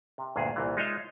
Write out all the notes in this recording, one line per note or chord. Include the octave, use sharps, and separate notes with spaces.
C3
D2 G2 A#2 G#4
C2 A#2 E3
G#3 D#4 F4 C#5 D#5 E5